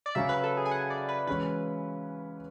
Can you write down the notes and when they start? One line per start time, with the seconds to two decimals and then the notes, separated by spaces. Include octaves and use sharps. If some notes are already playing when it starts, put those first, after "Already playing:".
0.06 D5
0.15 C#3 F#3 C#4 E5
0.29 B4
0.43 A4
0.57 G#4
0.65 G#5
0.71 F#5
0.90 D5
1.09 B4
1.27 E3 G#3 C#4 F#4 B4